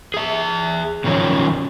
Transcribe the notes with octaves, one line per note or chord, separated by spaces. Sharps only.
G#4 E5
B2 D#3 F3 F#3 C#4